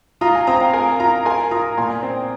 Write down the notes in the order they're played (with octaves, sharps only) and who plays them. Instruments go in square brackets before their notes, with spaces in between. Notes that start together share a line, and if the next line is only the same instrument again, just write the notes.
[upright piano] F4 [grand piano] A#5 D#6
[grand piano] G#5
[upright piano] C4 [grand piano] A#5 D#6
[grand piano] F5 A#5
[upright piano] A#4 [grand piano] G#5
[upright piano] F4 [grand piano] F5 A#5
[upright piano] A#4 [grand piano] G#5 C6
[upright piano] F4 [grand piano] A#5 D#6
[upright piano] A#2 [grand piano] G#5 C6
[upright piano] C4